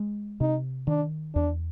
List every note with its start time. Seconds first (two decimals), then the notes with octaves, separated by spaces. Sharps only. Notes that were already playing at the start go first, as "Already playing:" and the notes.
Already playing: G#3
0.40 C3 D#4
0.87 D#3 D4
1.35 E2 D4